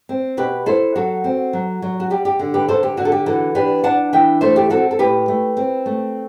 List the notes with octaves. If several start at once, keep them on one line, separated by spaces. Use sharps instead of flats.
C4
B2 G4 B4
E4 A4 C5
F#3 F#4 A4
C4
F#3
F#3
F#4
G3 G4
G4
D3
G4 B4
D3 A4 C5
G4
D3 F#4
A4
G4
E3 F#4 A4
D4 G4 B4
D4 F#5 A5
E3 E5 G5
A3 A4 C5
G4
C4 F#4 A4
A4
A2 G4 B4
A3
C4
A3